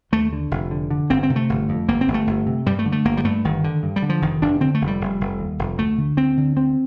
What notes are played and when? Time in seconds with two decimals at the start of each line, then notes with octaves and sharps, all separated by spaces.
0.12 D#2 A3
0.33 D3
0.51 F1
0.71 D3
0.91 D3
1.10 G1 C4
1.23 C4
1.30 C3
1.36 A3
1.49 G1
1.69 F2
1.88 G1 A#3
2.01 C4
2.08 G1
2.14 A3
2.27 G1
2.47 C3
2.66 G2 G3
2.79 A3
2.86 D3
2.92 A3
3.05 G1 A#3
3.17 G3
3.25 G2 A3
3.44 G1 D#3
3.64 D3
3.83 G2
3.96 G3
4.02 D3
4.09 F3
4.22 F1 D#3
4.42 F1 D4
4.61 D3 C4
4.75 A3
4.81 F1
4.87 G3
5.01 F1
5.20 F1
5.39 D#2
5.59 F1
5.78 D2 A3
5.98 D3
6.17 D2 C4
6.37 D3
6.56 D2 C4